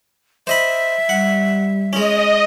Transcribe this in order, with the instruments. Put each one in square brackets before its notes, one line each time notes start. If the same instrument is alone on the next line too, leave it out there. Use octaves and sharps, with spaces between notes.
[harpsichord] C5 D#5 B5 [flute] E5
[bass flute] G3 [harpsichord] F#5
[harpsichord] G#3 C#4 [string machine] D#5